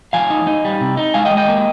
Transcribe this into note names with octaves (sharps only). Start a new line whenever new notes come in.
F3 F5 G#5
D#4
D#4
G3
C3
D#4
G#3 F5 G#5
D#5 G5
G#3
D#5 G5
A#3